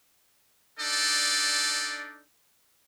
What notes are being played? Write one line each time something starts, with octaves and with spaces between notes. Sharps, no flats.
D4 D#4 A4 D5